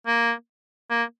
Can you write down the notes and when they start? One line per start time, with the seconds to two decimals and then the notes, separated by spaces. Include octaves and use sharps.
0.07 A#3
0.91 A#3